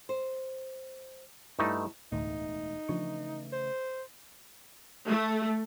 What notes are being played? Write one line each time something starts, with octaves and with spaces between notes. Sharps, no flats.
C5
G2 A3 D#4 E4
E1 D2 A2 A3 D#4
C#3 E3 F3 A3 D4 C#6
C5
A3